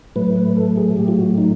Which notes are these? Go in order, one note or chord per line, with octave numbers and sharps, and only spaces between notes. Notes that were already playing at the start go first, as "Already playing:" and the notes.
A2 F#3 A3 B4
B4
A4
G#4
A2 F#3 A3 G4
F4
F#4
D#4